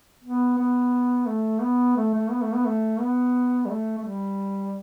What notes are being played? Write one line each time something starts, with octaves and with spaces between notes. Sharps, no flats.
B3
B3
A3
B3
A3
A3
B3
A3
B3
A3
B3
G3
A3
A3
G3